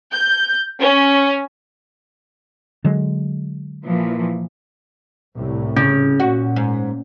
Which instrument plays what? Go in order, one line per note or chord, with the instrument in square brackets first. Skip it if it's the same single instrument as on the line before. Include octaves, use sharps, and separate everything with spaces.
[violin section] G6
C#4
[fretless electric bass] D3 F#3 G#3
[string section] A#2 E3 F3
[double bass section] C2 A2
[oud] C#3 [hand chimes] C#4
[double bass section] A#2 [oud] F#4
[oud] G#2